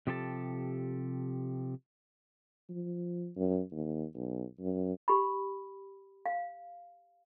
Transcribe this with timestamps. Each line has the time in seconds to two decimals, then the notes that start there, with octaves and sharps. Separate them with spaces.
0.07 C3 F3 G4 A4 B4 A5
2.69 F3
3.36 F#2
3.71 D#2
4.14 B1
4.60 F#2
5.08 G4 B5
6.26 F5